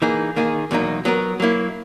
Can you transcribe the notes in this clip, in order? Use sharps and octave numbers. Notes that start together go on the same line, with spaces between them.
E3 A#3 D#4 G#4
D#3 A#3 D#4 G#4
E2 B2 F#3 A#3 D#4
F#3 B3 F#4 A#4
F#3 A#3 E4